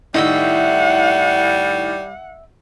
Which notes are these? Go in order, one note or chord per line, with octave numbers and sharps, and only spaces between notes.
A2 D#3 G3 D#5 E5 F#5 G5